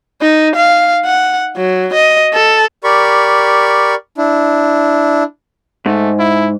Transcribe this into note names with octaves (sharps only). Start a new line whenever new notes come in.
D#4
F5
F#5
F#3
D#5
A4
G4 A#4 D5 B5 C#6
D4 E4
G#2 A3
E4